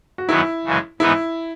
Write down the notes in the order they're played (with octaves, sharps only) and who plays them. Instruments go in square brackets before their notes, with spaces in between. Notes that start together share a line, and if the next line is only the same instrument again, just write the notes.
[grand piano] F#4
[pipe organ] F#2 D#3 F#3 B3 [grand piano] E4
[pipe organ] F#2 C#3 E3 G#3
[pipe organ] G#2 E3 B3 D#4 [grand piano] E4